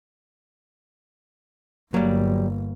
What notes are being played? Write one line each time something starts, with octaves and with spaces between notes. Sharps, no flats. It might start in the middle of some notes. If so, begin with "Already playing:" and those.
G1 F#3 G3 A#3